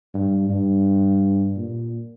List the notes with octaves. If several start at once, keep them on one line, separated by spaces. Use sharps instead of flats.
G2
G2
A#2